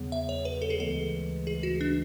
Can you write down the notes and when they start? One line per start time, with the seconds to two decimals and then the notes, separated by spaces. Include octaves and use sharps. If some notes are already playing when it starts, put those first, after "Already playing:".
Already playing: E2 C#3 F#3 B3
0.12 E5
0.29 C#5
0.45 B4
0.62 A4
0.70 G#4
0.79 D2 C#3 E3 G#3 A4
1.47 G#4
1.63 F#4
1.81 D4